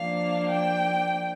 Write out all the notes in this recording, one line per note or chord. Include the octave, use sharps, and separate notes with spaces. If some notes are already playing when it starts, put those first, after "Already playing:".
Already playing: F3 A#3 D4 F5
G5